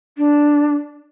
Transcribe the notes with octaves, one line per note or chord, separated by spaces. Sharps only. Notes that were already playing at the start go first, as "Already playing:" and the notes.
D4